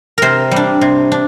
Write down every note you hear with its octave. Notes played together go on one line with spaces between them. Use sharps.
C3 A#4 C5
G3 D4
C3
D4